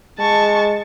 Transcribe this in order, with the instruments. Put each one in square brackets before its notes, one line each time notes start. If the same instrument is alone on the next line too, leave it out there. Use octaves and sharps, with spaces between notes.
[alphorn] G#3 [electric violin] A5 C#6